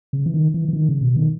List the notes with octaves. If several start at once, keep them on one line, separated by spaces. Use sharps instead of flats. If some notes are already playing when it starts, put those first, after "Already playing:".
C#3
E3
D#3
E3
E3
D#3
C#3
B2
D#3